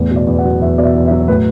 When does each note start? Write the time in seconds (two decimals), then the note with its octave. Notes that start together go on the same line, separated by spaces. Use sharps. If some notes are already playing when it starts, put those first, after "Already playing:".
Already playing: E2 A2
0.11 B2
0.16 D5
0.27 E2
0.38 F#5
0.45 F#3
0.61 E2 E5
0.78 B2 D5
0.84 E5
0.95 E2
1.06 E5
1.11 F#3
1.28 A2 B4